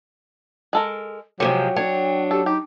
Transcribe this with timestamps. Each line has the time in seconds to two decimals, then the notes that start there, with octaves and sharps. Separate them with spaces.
0.73 G#3 A4 A#4
1.40 C3 F3 F#3 G#3 G4 G5
1.76 D4 C#5
2.31 G4 A4
2.46 D#4 G4